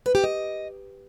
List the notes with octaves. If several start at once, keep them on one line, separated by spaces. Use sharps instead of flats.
B4
G4
D#5